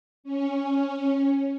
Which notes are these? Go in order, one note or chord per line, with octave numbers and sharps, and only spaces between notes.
C#4